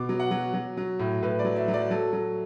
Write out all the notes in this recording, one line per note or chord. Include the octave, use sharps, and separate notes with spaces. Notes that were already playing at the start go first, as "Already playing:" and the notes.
Already playing: B2 D6
F#3
F#5
F#3
F#3
F#3
A2
A2 B4
D5
F#3
E5
F#3
D5
F#3 A4
F#3